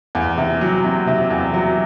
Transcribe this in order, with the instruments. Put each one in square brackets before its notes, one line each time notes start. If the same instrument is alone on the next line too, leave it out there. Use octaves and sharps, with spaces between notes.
[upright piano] E2
C3
F#3
C3
C3
E2
F#3